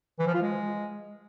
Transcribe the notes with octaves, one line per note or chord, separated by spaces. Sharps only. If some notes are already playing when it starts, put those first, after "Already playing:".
E3
F3
F4
G#3